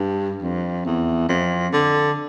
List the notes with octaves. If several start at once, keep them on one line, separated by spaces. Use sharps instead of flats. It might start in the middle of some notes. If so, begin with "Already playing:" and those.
Already playing: G2
F2
E2
F2
D3